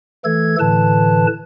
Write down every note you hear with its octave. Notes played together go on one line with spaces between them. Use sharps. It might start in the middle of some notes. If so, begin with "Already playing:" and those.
E3 A3 A4 G#6
A2 D3 E3 B4 A5